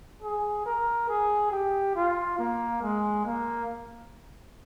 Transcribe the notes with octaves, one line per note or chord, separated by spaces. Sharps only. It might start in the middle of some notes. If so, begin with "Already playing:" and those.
G#4
A#4
G#4
G4
F4
A#3
G#3
A#3